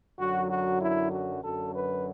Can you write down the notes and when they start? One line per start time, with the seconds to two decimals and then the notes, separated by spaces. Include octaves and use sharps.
0.18 F#2 D3 F#3 F#4
0.49 F#4
0.80 E4
1.11 F#4
1.42 F#2 D3 F#3 A4
1.73 B4